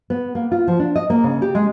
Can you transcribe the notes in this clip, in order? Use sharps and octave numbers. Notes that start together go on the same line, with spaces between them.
B3
A#3
F4
F3
D4
D#5
A#3
C#3
G4
G#3